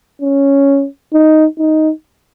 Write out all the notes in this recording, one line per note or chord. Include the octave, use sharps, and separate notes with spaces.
C#4
D#4
D#4